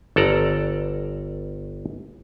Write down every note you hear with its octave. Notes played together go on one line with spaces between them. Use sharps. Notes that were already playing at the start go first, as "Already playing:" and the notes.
G1 A4 D5 A#5